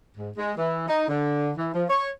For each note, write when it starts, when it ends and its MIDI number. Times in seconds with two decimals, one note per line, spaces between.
0.17 0.30 44
0.37 0.53 56
0.57 0.87 52
0.88 1.05 63
1.08 1.51 50
1.57 1.69 52
1.74 1.84 53
1.89 2.09 73